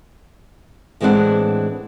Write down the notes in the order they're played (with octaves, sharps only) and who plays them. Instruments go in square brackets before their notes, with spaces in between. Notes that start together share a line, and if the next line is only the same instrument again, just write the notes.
[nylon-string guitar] A2 E3 G#3 C4 D4 F#5